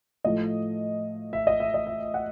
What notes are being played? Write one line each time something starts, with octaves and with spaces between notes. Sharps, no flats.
A2 F3 A3 D#5
E5
D#5
E5
D#5
E5
F#5